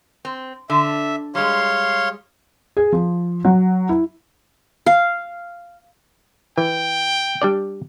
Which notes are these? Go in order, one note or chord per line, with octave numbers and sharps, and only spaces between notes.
C4
D3 E5
G3 G#3 C#5 F5 C6
G#4
F3
F#3
E4
F5
E3 G5
G3 D4 D5